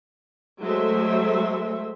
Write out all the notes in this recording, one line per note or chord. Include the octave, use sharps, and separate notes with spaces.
F#3 G#3 A3 C5 E5